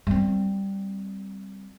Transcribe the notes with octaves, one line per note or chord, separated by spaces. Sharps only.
G3 C4